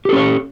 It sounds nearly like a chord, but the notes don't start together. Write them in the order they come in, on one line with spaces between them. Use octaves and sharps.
G4 A4 C#4 C#5